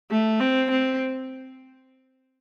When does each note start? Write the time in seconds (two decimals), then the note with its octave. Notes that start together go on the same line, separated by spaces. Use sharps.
0.10 A3
0.40 C4
0.70 C4